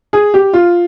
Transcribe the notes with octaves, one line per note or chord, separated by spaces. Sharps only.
G#4
G4
F4